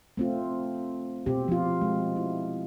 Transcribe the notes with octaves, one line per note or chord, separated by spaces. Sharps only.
A3 C4 F4
B2 C4 G4
F3 F4
G#3
E4